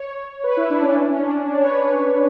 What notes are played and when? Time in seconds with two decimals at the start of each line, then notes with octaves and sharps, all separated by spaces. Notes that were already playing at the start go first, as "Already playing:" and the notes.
Already playing: C#5
0.44 B4
0.57 E4
0.70 D4
0.82 C#4
0.95 D4
1.09 C#4
1.22 D4
1.35 C#4
1.48 D4
1.57 C#5
1.64 B4